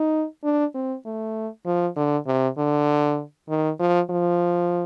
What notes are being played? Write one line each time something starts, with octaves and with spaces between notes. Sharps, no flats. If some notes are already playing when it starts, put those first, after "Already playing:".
Already playing: D#4
D4
C4
A3
F3
D3
C3
D3
D#3
F3
F3